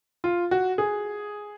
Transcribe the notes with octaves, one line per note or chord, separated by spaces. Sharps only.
F4
F#4
G#4